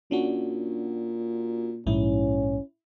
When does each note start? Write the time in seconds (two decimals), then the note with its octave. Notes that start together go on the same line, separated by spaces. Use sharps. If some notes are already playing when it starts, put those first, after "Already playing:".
0.11 A#2 C#4 D4 F#4
1.87 A#1 G#2 C#4 E4